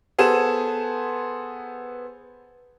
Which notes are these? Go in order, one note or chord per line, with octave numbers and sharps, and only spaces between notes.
B3 G#4 A4 C5 E7